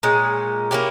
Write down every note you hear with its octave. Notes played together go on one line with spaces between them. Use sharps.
A#2 G#3 C#4
A#3 C#4 E4 G4